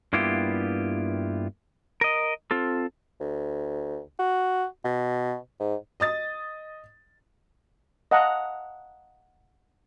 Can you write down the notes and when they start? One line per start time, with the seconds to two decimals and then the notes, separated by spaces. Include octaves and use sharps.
0.13 G2 A#3 B3 E4 F4 G4
2.01 A#4 D#5
2.51 C4 F4 A4
3.21 D2
4.19 F#4
4.84 B2
5.60 G#2
6.00 D#5 D#6 A6
8.11 D#5 F5 F#5 A5 A#5